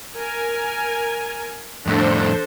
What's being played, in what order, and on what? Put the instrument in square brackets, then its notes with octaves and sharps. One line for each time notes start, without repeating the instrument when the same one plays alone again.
[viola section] A#4 G#5
[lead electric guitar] F2 A2 [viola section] D4 A4 C5